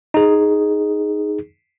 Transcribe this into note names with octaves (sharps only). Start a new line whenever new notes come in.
D#4 G#4